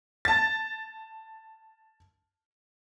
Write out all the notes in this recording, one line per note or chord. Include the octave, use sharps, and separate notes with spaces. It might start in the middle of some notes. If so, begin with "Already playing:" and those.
A5 A6